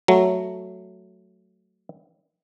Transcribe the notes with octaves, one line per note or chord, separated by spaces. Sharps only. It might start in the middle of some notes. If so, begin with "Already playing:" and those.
F#3 A3